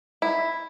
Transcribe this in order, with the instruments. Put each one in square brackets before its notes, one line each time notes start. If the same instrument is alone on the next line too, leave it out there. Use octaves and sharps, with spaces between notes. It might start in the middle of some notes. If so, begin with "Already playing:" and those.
[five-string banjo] E4